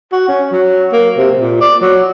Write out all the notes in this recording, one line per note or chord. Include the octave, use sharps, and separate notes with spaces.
F#4
C#4
F#3
A#3
C3
A#2
D5
F#3